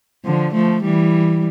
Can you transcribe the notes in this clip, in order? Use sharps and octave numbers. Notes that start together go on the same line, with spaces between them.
D3 F3
F3 A3
E3 G3